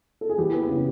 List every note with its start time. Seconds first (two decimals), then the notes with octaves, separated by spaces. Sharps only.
0.21 A4
0.29 G#4
0.38 E3 G4
0.54 B3
0.69 C#3